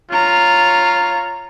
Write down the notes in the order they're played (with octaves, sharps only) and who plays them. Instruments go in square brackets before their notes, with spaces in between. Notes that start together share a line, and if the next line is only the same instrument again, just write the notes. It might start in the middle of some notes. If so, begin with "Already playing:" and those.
[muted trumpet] F4 [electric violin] C#5 A#5